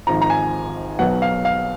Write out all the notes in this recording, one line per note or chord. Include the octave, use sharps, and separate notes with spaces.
G#1 G#2 F3 A#5
A#5
G#5
B1 B2 F#3 B3 F#5
F5
F5